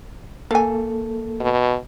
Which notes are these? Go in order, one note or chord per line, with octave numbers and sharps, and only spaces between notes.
A#3 A4 F5 G#5
B2